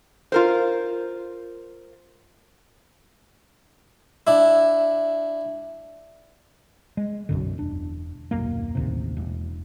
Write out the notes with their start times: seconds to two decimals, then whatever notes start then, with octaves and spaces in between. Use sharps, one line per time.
0.32 F4 A#4 C5
4.27 D4 E4
6.97 G#3
7.29 B1 F#2 D3
7.58 E1 D4
8.31 D#1 B1 F#2 A#3
8.75 A1 D#2 C3
9.17 E1